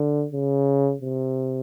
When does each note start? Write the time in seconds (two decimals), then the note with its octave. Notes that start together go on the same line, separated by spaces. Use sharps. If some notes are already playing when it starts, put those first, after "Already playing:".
Already playing: D3
0.33 C#3
1.02 C3